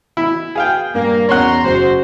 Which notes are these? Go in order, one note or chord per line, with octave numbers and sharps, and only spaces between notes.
E4
G#4 B4 F5 G5
G2 A#2 A#3
E2 C#4 C#5 F#5 A#5 C6 F#7
F#1 F#4 G#4 C5